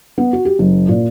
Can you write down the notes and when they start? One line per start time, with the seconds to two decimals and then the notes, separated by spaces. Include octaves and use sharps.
0.18 B3
0.33 F#4
0.45 G4
0.59 F#1
0.88 A#2